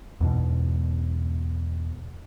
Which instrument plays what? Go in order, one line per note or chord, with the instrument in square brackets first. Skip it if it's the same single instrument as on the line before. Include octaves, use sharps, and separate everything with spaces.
[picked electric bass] E2 G#2 B2